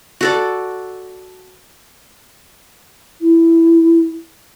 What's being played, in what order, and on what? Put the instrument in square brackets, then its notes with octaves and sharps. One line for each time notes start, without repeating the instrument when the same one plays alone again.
[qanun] F#4 A4 D5
[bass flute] E4